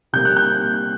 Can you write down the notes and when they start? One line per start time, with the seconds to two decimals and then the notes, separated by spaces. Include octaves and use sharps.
0.13 C3 G3 A#3 G6
0.25 F#6
0.37 G6